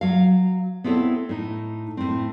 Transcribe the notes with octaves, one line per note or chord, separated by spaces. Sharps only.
F#3 F5
B3 C4 E4 G4 A4 C#5
A2 D#4
A2 C4